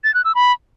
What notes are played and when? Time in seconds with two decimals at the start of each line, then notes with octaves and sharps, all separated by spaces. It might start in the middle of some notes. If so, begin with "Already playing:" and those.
0.04 A6
0.14 F#6
0.25 E6
0.35 B5